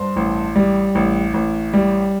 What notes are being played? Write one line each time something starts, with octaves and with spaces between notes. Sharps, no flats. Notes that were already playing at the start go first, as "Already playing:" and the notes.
Already playing: G2 C5 C6
A1
G3
A1
A1
G3